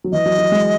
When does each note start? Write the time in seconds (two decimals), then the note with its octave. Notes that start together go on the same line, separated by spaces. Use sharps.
0.04 F#3
0.12 E3 D#5
0.26 F#3
0.39 F#3
0.52 G#3